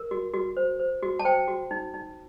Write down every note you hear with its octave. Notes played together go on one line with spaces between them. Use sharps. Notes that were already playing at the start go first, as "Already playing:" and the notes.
Already playing: A#4
F#4
F#4
C5
C5
F#4
A5
C5 G5
F#4
D#4
D#4